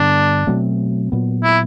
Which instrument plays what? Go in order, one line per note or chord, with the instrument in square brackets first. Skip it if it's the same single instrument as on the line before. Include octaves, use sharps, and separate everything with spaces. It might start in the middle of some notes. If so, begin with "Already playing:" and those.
Already playing: [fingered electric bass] G2 D3 G3 B3 [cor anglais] D4
[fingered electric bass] B2 F#3 A3 C4
A#2 F#3 B3
[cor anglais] E4